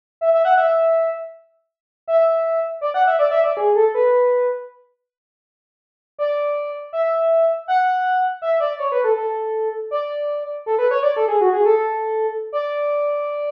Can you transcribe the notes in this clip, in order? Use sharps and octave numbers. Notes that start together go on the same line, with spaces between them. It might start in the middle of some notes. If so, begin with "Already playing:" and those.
E5
E5
F#5
E5
E5
D5
F#5
E5
D5
E5
D5
G#4
A4
B4
D5
E5
F#5
E5
D5
C#5
B4
A4
A4
D5
A4
B4
C#5
D5
A4
G#4
F#4
G#4
A4
D5